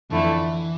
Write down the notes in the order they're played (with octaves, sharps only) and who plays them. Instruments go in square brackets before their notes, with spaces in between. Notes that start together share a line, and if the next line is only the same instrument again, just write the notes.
[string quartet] F2 D3 A3 E4 [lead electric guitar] E3